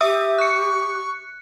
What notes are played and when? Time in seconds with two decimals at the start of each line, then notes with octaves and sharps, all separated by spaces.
0.01 G4 E5 D#6 E6
0.38 C#6 F#6 C#7